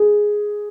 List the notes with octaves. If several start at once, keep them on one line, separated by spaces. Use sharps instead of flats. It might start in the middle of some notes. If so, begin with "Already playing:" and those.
Already playing: G#4